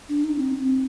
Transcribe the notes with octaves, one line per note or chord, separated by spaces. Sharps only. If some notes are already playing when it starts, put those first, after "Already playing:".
D4
D#4
C4
C4